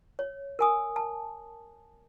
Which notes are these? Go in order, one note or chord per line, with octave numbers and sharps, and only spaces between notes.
C#5
A#4 G#5 D#6
A5